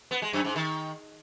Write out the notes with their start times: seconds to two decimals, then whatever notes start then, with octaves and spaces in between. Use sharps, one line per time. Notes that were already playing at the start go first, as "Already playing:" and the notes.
0.11 B3
0.22 G#3
0.33 F#2
0.45 G#2
0.56 D#3